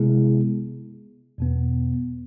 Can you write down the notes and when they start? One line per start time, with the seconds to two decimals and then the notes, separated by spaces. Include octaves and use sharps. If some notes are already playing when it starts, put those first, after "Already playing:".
Already playing: C3 G#3 B3 E4 G#4
1.38 E2 B2 B3